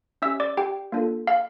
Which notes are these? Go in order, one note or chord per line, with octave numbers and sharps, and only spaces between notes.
C#4 G4 E5 E6
D5 D6
G4 G5
A#3 D4 F4 A4
F5